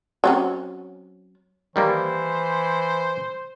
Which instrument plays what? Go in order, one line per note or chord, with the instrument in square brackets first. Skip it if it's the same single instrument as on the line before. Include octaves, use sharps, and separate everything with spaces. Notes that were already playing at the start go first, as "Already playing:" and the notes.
[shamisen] F#3 C4 C#4
[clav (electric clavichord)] D#3 G3 A#3 [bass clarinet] E3 [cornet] C5